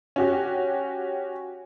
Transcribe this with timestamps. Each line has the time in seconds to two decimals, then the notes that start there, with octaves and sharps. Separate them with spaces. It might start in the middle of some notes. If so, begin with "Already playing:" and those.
0.16 C#4 F#4 G4